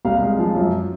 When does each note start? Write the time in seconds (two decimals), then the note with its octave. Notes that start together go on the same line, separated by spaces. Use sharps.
0.05 C2 F5
0.21 G#3
0.39 F3
0.55 F#2